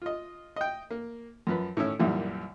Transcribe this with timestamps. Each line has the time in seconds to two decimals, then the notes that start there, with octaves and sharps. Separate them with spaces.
0.02 F4 D#5
0.56 D#5 G5
0.91 A#3
1.47 F#2 F3 B4
1.77 A2 D#3 C#4 E5
1.99 C2 F#2 A#2 D#3 E3 G3